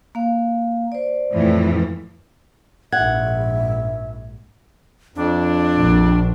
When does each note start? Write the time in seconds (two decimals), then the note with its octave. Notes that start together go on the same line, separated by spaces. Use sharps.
0.15 A#3 F5
0.92 C5 D5
1.32 F2 A2 E3
2.92 A#1 G#2 E5 F#5 G#6
5.16 F2 D4
5.77 A#1